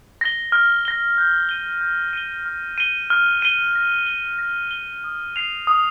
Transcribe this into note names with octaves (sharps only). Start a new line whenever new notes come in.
A#6 G7
F6
A#6 G7
G6
D#7 G7
G6
D#7 G7
F6
D#7 G7
F6
D#7 G7
A#6
G7
A#6
G7
D#6
C7 F7
D#6